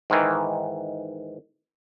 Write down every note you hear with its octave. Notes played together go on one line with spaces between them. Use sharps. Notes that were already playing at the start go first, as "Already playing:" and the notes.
G#2 D#3 E3